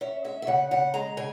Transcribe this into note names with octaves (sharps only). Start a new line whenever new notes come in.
C#4 E5
G#3 E5
E5
C#3 F#5
C#3 F#5
G#3 A#5
C#3 G#5